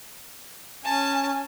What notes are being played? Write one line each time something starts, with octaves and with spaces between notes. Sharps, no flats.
C#4 G#5 A5